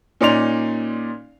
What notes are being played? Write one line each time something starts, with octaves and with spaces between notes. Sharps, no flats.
A#2 C#4 D#4 D5 C6 F7